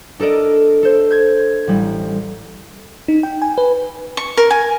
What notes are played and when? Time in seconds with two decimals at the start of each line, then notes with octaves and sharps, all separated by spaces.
0.20 D4 A4 A#4 D5 D#5
0.83 A4 C5
1.11 G6 G#6
1.67 A1 G3
3.08 D#4
3.23 G5
3.42 G#5
3.58 B4
4.17 C#6
4.37 A#4
4.51 G#5